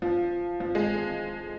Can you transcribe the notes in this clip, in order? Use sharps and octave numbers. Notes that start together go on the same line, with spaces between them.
F3
F3
G#3